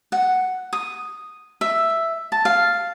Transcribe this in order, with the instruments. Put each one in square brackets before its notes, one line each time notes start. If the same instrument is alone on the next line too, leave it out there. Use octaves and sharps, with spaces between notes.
[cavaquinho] F#5
D#6
E5
A5
F5